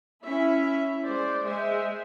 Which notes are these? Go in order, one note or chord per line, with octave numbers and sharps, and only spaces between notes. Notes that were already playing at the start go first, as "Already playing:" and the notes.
C#4 E4 E5
G#3 C5 D5
G#3 C5 E5